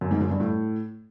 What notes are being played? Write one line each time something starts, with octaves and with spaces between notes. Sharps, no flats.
F#2
G#2
F#2
G2
A2